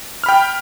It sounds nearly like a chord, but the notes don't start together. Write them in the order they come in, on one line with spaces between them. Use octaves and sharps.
F6 B5 G5